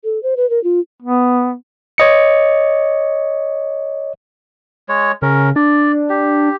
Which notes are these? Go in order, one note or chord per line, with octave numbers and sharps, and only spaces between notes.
A4
C5
B4
A#4
F4
B3
C#5 D#5 C#7
G#3 C#5
C#3 C#4 A#4
D4 D5
G4